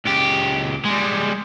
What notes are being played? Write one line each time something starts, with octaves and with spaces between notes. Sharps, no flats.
C#2 G4
G3 G#3